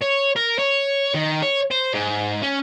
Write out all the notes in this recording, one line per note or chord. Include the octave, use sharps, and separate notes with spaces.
C#5
A#4
C#5
D#3
C#5
C5
G#2
C#4